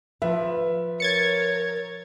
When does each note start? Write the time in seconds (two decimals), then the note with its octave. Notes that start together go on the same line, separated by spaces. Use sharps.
0.22 F3 B4 E5
1.00 A#4 C#5 G#6 A6 C#7